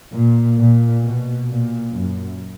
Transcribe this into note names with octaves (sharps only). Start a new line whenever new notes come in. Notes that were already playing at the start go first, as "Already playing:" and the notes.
A#2
A#2
B2
A#2
F#2